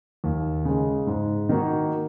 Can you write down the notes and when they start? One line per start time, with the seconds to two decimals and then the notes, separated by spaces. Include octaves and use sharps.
0.24 D#2
0.65 C#3 G#3
1.07 G#2
1.49 D#3 A#3 D#4 F#4